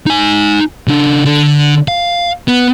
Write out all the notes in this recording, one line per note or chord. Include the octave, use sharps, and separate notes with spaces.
D#4 G#5
C#3 D4
D3
F5
B3